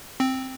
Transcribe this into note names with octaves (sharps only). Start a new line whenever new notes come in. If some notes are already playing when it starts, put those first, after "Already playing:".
C4